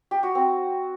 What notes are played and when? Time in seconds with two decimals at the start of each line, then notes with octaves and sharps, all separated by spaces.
0.11 G4
0.23 F#4
0.35 C4